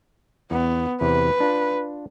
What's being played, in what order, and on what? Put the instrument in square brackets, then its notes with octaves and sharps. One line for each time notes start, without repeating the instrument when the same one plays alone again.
[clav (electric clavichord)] E2 [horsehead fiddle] B3
[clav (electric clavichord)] E2 C3 [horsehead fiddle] B4
[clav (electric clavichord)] D4 F4